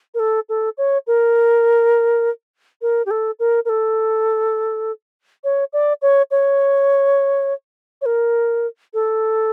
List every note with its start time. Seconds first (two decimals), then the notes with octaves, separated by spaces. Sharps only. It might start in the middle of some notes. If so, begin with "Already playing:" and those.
0.14 A#4
0.19 A4
0.49 A4
0.78 C#5
1.07 A#4
2.82 A#4
3.06 G4
3.11 A4
3.39 A#4
3.65 A#4
3.69 A4
5.44 C#5
5.73 D5
6.02 C#5
6.31 C#5
8.02 C#5
8.06 A#4
8.94 A4